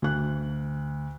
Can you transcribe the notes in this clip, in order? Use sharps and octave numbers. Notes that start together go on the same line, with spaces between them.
D2 F#6